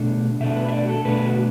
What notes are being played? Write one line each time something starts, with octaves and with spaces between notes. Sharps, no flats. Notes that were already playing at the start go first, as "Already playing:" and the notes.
Already playing: B2 A3 D4
B2 A3 D4 E5
B4
E5
D5
F#4
A4
B2 A3 D4 B4
F#4